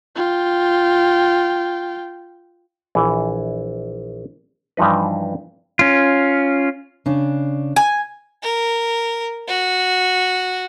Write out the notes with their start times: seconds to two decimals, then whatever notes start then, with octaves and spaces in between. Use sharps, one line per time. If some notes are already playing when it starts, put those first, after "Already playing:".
0.16 F4 G5
2.95 A#1 E3
4.77 G2 E3 F3 D#4 B4
5.79 C#4 F4
7.06 C#3 D4
7.76 G#5
8.43 A#4
9.48 F#4